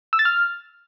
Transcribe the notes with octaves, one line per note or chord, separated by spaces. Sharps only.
E6
A6
F6